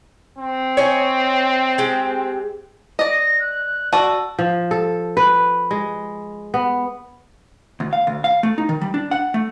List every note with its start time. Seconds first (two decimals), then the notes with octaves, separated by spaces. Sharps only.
0.38 C4
0.77 C#5 D#5 G#5
1.78 G#3 G4
2.99 D5 D#5 A#6
3.40 F#6
3.93 F#4 D5 A5 E6
4.39 F3
4.71 A4
5.17 B4
5.71 G#3
6.54 B3
7.80 D2
7.93 F5
8.07 D2
8.24 F5
8.43 A3
8.58 D#4
8.69 D#3
8.81 G3
8.94 D4
9.11 F#5
9.34 A3